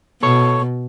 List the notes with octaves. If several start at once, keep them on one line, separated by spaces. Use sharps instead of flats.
B2 A4 C#5